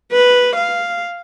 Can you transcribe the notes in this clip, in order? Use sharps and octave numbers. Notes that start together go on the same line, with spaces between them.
B4
F5